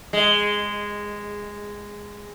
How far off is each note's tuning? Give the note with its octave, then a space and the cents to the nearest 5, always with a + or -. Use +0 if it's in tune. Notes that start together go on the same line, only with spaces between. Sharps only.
G#3 -10